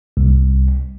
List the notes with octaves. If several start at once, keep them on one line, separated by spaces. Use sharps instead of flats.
C2